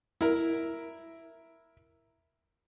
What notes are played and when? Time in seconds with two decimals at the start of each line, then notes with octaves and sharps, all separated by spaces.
0.21 E4 A#4